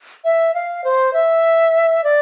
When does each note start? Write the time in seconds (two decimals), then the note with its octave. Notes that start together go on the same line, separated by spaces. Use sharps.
0.24 E5
0.54 F5
0.84 C5
1.13 E5
2.04 D5